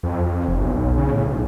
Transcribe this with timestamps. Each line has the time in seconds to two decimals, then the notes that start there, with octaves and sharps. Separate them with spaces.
0.03 F2
0.26 F2
0.48 F1
0.61 B1
0.74 B1
0.97 C#3
1.12 A2
1.26 B1